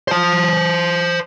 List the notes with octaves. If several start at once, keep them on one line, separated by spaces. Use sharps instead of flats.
C5 A5